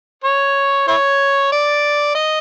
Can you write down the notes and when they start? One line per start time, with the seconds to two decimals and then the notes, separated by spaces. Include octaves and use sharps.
0.24 C#5
0.88 E4 C#5
1.52 D5
2.15 D#5